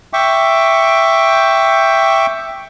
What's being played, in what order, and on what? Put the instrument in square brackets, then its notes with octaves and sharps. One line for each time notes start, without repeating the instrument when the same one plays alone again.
[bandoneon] E5 G5 C#6 D6